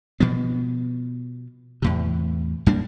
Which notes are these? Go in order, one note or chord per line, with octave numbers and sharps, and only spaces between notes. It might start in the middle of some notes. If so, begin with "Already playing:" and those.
B2 F3 B3
E2 A2 C3
F#2 G3 A#3 D4